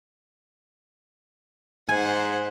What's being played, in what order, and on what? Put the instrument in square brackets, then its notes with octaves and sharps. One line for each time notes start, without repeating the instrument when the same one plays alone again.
[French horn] G#2 [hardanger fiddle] C5 F#5 [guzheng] G#5